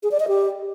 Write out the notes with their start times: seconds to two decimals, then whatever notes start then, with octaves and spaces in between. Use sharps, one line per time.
0.03 G#4
0.11 D5
0.20 D#5
0.28 G4